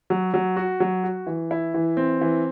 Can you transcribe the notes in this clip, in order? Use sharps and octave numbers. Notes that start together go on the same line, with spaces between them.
F#3
F#3
F#4
F#3
F#4
E3
E4
E3
C4
E3